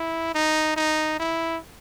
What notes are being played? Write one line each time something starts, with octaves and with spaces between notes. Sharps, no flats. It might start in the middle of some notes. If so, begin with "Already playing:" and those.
Already playing: E4
D#4
D#4
E4